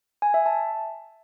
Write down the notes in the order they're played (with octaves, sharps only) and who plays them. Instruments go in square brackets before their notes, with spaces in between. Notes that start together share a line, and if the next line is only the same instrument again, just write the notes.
[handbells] G#5
E5
A5